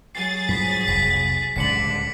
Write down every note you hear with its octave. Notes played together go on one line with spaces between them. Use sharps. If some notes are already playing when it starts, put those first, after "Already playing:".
F#3 G#4 A6 C7
G2 F3 B6
F1 B1 B6
D1 C#2 G2 D3 B6 C#7 F#7